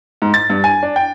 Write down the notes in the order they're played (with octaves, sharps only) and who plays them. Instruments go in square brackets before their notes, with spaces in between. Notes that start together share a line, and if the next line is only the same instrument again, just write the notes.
[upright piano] G#2
A6
G2
G#5
D4
G5